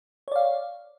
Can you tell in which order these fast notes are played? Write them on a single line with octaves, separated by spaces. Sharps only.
C#5 D5 F5